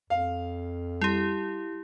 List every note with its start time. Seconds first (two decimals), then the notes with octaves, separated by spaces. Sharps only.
0.10 F2 F5
1.01 G3 E4 G4